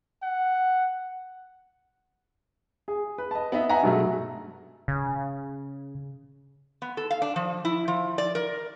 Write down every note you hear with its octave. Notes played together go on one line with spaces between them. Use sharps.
F#5
G#4
B4
D#5 A5
B3 D#4 E5
E5 F#5 G#5 A#5
G2 B2 F#3 G#3 A3
C#3
B3
A4
F5
D4
F3
E4
F3
D5
A#4